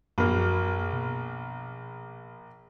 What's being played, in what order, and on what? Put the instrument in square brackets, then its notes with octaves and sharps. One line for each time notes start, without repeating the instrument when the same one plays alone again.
[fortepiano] A#1 A#3 [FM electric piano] F#2 F#4 B5
[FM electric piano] B2